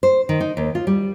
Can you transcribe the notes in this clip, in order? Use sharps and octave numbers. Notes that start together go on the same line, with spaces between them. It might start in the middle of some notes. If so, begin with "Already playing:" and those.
C5
D#3
D#4
D#2
F4
G3